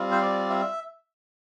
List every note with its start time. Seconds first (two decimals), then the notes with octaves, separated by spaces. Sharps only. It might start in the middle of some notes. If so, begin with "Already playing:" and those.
Already playing: G3 C4 F4
0.12 C5
0.22 D5
0.50 E5